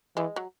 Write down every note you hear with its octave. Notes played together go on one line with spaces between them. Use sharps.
E3 G#3
F#3